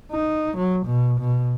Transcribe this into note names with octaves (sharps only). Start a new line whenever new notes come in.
D#4
F#3
B2
B2